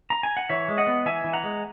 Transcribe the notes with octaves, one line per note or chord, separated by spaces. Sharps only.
A#5
G#5
F#5
E3 C#5 E5
G#3
D#5 F#5
B3
E3 E5 G#5
E3
F#5 A#5
G#3